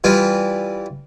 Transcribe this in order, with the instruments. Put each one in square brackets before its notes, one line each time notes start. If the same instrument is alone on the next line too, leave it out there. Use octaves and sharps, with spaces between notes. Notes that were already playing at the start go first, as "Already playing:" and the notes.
[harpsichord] E3 G3 F4